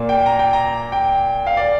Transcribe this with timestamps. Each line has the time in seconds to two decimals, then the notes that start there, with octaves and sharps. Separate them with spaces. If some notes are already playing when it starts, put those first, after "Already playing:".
Already playing: A#2 A#3
0.09 G5
0.26 A#5
0.39 G5
0.53 A#5
0.92 G5
1.46 F5
1.57 D5